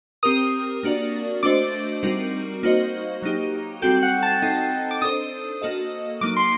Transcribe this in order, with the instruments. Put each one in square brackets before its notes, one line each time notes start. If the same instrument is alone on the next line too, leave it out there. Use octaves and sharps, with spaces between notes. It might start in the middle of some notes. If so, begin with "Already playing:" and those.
[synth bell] C4 G4 A#4 [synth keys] D#6
[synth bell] A#3 D4 F#4 A#4 D5
[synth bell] A3 D4 F#4 C5 D#5 [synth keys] D6
[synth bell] G3 C4 D#4 F#4 A#4
A#3 D#4 F#4 C5 D#5
F#3 A#3 D#4 G4
[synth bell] G3 C4 F#4 A4 [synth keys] G5
[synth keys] F#5
A5
[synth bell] C4 D#4 A4 D#5
[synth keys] D6
[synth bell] D4 A4 C5 [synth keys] D#6
[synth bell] A#3 F#4 A4 D#5
[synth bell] F#3 A#3 D#4 [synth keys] D6
[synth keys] C6